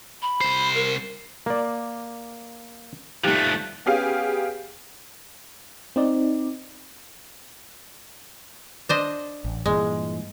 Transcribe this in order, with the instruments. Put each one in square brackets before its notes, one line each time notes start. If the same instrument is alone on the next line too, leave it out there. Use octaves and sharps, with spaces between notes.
[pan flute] B5
[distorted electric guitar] C2 C5
[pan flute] A#4
[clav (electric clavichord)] A#3 D5
[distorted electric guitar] F3 A3 [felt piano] G3 D#4 G4 [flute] F#6
[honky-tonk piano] B3 C#4 G4 G#4 F5
[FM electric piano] C4 D#4 D5
[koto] D4 C5 D#5
[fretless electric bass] A1
[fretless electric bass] G2 A#2 E3 [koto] G#3